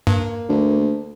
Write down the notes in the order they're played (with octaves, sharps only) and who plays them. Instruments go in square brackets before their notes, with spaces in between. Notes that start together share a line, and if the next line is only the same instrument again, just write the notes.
[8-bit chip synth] G2 [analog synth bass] A#3
[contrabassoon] D2